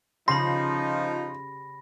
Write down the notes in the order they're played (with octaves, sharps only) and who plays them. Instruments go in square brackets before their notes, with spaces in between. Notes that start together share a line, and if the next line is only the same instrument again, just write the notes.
[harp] C#3 G4 [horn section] F3 D#4 [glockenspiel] B5 A#6 [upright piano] C6